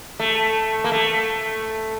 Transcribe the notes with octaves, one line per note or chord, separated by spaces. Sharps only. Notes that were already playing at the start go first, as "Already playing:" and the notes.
A3
A#3
A3